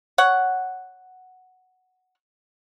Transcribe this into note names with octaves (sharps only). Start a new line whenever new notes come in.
C#5 F#5